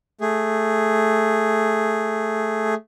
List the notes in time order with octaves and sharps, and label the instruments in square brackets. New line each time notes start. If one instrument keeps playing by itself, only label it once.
[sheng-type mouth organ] A3 G#4